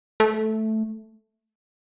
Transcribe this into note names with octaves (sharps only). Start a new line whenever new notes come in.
A3